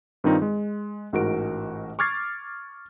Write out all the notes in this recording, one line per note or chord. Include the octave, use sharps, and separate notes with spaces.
G2 D#3 C4 D#4 F4
G#3
A1 G#2 F#4 A#4 D7
C#6 D6 F6 G#6 A6 C7